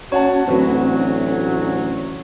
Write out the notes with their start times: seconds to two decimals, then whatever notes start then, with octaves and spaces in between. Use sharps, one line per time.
0.12 C#4 F#4 C#5 F#5 A5
0.48 A1 D2 F#3 C4 F#4 B4